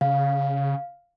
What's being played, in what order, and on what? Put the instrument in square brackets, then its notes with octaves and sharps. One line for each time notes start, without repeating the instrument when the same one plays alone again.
[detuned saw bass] C#3 [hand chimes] F5